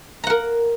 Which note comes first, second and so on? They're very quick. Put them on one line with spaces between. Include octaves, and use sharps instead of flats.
A#5 F#5 A#4